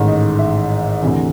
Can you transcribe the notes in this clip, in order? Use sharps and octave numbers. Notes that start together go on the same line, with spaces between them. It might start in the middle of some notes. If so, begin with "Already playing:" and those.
Already playing: A1 G#2 D#3
D#5
E5
D2 C3 E3